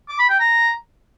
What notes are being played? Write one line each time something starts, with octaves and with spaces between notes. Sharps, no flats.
D6
B5
G5
A#5